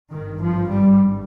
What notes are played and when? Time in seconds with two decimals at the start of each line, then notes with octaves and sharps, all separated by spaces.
0.13 G#1 G2 D#3
0.42 F3
0.72 G3